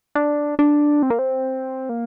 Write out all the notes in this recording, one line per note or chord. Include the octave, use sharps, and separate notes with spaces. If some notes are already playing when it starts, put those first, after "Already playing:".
D4
D4
C4
A#3
C4
A#3